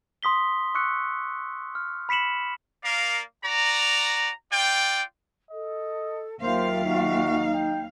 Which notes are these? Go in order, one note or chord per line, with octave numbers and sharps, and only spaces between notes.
C6 D#6 B6 G7
C6 C#6 E6 F#6 C#7
F6
B5 B6 C#7 E7 F#7
A#3 A#4 D5 F5
F#4 D5 A#5
F4 D5 G5
A4 D#5
D#2 F#3 A#3 F4 C5 E5 F5 G5
D#4 F#4
G5